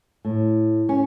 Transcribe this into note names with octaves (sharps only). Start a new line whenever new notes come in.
A2
C#4